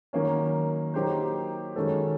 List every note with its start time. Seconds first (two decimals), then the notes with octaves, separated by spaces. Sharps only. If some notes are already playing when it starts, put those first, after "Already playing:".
0.13 D#3 F#3 A#3 C#4
0.94 F#3 A#3 D#4 G4 C5
1.76 D#3 G#3 C#4 F#4 A4